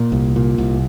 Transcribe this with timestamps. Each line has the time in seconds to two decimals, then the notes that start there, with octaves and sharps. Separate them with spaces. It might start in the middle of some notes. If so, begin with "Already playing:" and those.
Already playing: A#2
0.12 C2
0.36 A#2
0.58 C2